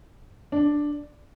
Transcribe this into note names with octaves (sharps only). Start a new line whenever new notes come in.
D4